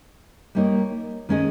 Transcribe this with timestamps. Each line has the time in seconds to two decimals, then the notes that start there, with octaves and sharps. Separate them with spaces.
0.55 G3 A#3 D#4 A#4 C#5
1.29 D#3 G#3 C#4 G#4 D#5